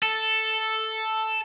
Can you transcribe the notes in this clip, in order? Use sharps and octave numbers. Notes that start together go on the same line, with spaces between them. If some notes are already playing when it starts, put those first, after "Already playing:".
A4